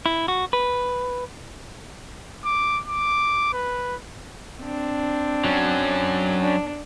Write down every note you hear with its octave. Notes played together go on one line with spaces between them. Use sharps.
E4
F#4
B4
D6
D6
B4
C4 D4
F#3 C#4
D4